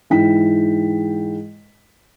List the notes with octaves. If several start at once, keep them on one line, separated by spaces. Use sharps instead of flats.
G#2 E3 E4 G5 B6